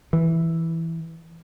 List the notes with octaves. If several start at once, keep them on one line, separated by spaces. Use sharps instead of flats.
E3